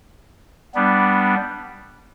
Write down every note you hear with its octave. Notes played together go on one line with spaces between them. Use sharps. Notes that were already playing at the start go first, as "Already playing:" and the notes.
G3 B3 D4